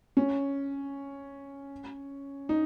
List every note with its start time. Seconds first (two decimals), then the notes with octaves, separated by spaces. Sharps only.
0.17 C#4
2.49 D#4